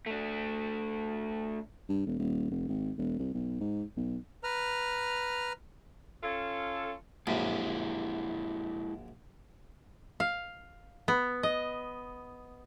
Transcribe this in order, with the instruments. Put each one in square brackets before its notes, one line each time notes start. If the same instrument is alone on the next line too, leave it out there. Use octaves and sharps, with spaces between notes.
[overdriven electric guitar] A3 D4
[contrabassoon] G2
E1
D#1
F1
G#1
E1
C2
B1
G#2
B1
[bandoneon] B4 A#5 F6
[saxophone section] C#4 F4 A4
[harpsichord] A#1 F#2 [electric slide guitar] G#3 E4 G4
[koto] F5
B3
D#5